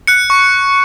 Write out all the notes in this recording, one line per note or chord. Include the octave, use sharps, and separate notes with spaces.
F#6 C#7
C#6